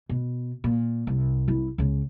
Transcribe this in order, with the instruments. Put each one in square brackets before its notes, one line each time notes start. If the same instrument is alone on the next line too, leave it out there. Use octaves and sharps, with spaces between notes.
[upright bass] B2
A#2
C2
C2 E4
C#2 C#3